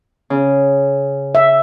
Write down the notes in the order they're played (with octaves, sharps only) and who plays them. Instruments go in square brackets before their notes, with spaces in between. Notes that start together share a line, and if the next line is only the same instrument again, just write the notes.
[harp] C#3
[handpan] E5